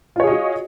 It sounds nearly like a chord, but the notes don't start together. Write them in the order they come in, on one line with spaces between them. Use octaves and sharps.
F4 C#5 G#4 D#5 F#4